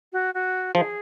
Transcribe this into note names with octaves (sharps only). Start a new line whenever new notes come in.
F#4
F#4
F3 G#4